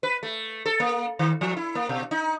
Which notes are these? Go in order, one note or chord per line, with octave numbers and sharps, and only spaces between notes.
B4
A3
A4
A#3
D#3
F3
E4
A#3
B2
D#4